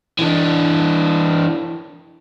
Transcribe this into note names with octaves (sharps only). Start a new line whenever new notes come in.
E3 D4